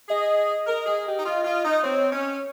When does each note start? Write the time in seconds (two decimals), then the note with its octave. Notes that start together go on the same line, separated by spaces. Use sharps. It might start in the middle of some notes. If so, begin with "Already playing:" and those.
0.09 G#4 D#5
0.67 A#4
0.86 G#4
1.07 G4
1.18 D#4
1.26 F4
1.45 F4
1.64 D#4
1.83 C4 C#5
2.12 C#4